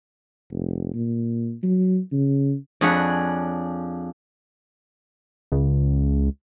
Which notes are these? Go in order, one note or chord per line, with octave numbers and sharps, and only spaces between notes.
F1
A#2
F#3
C#3
F2 D4 G#4 C#5 F#5 B5
C#2